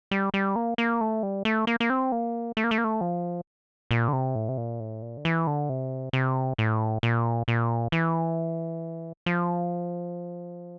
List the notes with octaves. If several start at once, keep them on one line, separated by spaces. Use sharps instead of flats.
G3
G3
A#3
A#3
A3
G3
A3
A#3
A#3
C4
A#3
A3
A#3
A3
A#3
A3
F3
A#2
D3
C3
A2
C3
A#2
A2
A#2
D3
E3
D3
C3
C3
A2
A#2
A#2
E3
F3